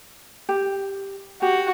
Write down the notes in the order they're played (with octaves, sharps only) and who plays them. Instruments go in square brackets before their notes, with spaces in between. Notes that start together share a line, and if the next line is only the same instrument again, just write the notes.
[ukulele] G4
[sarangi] F#4 [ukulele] G4